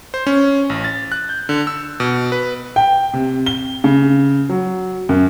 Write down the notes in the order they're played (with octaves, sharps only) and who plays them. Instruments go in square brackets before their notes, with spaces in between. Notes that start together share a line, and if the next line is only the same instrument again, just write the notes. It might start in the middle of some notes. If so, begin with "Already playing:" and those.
[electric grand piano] C5
C#4
A1
A6
F#6
G6
D3
E6
B2
B4
[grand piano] G5
C3
G7
C#3
F#3
F#2